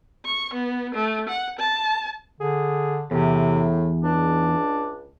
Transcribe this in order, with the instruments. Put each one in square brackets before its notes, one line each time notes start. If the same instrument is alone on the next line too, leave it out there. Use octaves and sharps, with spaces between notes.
[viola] C#6
B3
A3
F#5
A5
[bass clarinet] D3 [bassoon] G#4
[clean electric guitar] E2 [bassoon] A2 [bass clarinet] C3
[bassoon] C#2 [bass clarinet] D4